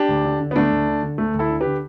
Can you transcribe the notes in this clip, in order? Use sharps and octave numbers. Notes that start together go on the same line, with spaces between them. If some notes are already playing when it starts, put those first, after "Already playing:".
Already playing: D4 G4
D2
D3
D3
B3
D2 A3 D4
D2
D3
D3
D2 A3
D2
E4 A4
D3
D3 G4 B4